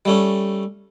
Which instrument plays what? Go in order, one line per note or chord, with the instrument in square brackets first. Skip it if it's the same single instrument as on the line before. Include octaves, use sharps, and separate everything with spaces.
[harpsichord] G3 A3 C#4